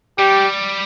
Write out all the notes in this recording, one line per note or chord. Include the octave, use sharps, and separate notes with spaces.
G3 G4